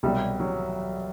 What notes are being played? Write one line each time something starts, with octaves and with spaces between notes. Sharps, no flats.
C2 B2 F#3 G3
F#3